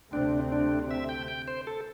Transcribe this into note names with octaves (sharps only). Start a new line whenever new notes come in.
D2 C3 A3 C4 D4
D4
E5
G5
G5
C5
A4